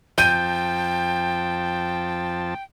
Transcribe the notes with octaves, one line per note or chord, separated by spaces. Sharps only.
F2 F3 G5 A5 G6 D#7